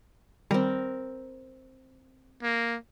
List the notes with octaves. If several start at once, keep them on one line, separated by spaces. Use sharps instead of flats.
D#3 G3 C4 A#4
A#3